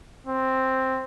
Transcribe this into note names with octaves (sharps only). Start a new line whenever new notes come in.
C4